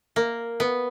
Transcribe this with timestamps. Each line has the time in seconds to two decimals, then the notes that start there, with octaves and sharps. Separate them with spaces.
0.16 A#3
0.60 B3